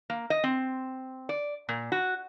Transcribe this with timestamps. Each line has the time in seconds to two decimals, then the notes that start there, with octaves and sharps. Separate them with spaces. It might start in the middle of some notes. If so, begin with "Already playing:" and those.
0.10 A#3
0.30 D#5
0.44 C4
1.29 D5
1.69 A#2
1.92 F#4